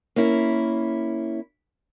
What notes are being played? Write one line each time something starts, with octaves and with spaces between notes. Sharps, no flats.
A#3 C#4 E4